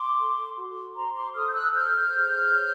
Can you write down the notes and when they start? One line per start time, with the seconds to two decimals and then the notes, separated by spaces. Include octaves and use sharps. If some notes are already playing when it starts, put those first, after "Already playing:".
Already playing: C6 D6
0.18 A4
0.57 F#4
0.95 C5 A#5 C6
1.15 C6 D6
1.34 A4 D#6 F6
1.48 G6
1.54 E6 F#6
1.73 C5 F6 G6
2.13 G#4
2.52 C#5